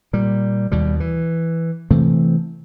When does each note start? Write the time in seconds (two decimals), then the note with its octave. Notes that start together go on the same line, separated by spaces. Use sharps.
0.13 A#2 G3
0.72 D#2 B2 G3
1.00 E3
1.91 C3 E3 A3 C4